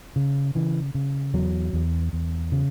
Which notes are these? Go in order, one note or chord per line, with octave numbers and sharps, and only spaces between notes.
C#3
C#3 E3
C#3
E2 F#3
E2
E2
C#3